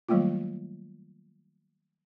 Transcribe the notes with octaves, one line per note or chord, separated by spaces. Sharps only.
D#3 F#3 G3 A3 A#3 F4